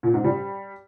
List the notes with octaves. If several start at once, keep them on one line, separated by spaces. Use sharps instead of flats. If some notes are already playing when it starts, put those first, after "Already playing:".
A#2
G#2
G3